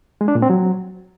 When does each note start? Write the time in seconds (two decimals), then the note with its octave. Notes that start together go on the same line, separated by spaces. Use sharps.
0.21 G#3
0.28 D4
0.35 A#2
0.42 C4
0.50 F#3